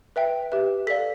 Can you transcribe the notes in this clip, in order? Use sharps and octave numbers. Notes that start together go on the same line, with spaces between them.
B4 E5 G5
G4 B4 E5
A4 D5 F5 B6